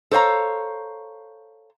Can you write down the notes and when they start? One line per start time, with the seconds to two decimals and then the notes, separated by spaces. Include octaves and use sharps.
0.11 A4 C5 C#5 F5 A#5